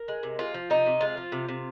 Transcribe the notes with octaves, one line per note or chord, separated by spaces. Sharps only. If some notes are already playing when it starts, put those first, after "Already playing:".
Already playing: A#4
G#3
C3
G#3 F4
F3
C3 D#4
C3
G#3 F4
F3
C3
C3